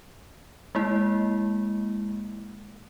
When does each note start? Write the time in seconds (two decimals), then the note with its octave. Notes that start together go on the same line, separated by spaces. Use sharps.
0.75 G#3 A#3 E4